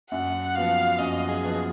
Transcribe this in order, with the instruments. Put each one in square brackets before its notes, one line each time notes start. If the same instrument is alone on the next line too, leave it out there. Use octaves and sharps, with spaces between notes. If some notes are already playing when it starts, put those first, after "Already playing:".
[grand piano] F#2 [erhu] F#5
[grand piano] F3 B3 F#4 [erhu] F5
[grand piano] F#2 [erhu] D#5
[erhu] G#4
[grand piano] F3 B3 F#4